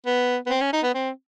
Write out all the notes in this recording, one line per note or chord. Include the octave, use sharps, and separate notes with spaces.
B3
B3
C4
C#4
D#4
B3
C4